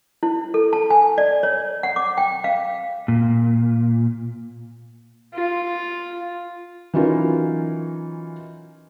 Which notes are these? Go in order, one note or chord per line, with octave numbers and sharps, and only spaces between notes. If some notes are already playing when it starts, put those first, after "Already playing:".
E4
A4
A5
G#5
D5
C#5
F#5
D6
G5
F5
A#2
F4
E3 F#3 C#4 D#4 F4 A#4